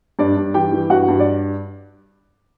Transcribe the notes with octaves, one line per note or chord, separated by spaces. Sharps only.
G2 D4 D5
G2
E3 G4 G5
E3
G2 F#4 F#5
G2
D5